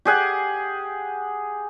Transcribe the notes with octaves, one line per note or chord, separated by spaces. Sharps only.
G4 G#4 F#5